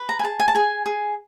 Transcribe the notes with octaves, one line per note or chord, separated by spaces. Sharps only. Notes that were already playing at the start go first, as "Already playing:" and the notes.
Already playing: B4
A#5
G#5
G#4 A5
G#5
A5
G#4 G#5
G#4